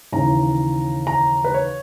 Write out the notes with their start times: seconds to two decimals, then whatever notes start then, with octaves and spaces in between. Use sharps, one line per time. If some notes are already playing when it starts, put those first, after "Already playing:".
0.12 D#2 C#3 E3 A#5
1.07 A#5
1.45 B4
1.54 C#5